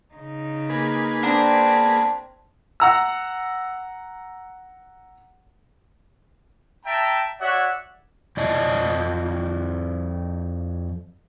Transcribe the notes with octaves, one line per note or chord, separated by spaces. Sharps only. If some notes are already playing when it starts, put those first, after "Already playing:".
C#3 D#4
A#3 G#4 B4
C4 D4 A#5
F#5 A#5 E6
E5 G5 A5 A#5
F#4 C#5 D5 E5 F#5
F2 F3 D5 D#5 A5